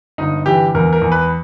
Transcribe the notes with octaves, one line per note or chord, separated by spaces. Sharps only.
G1 D#4
E3 G4
E2 A#4
A#4
E2
B4